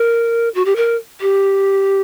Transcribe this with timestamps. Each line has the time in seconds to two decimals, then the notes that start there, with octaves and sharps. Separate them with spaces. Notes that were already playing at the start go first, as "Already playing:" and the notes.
Already playing: A#4
0.55 F#4
0.65 G4
0.76 A#4
1.21 G4